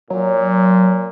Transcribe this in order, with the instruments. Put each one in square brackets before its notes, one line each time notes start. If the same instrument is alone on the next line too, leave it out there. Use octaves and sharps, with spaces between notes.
[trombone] A#2 [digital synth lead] F#3